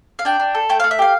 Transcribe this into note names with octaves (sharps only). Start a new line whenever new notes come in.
F5
D4 G5
D4
A4
A3 G5
A3 F5
E5
G4 F5